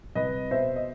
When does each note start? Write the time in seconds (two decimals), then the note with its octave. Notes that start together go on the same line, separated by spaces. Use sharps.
0.15 C2 B4 D#5
0.51 B2 C5 E5
0.76 D#5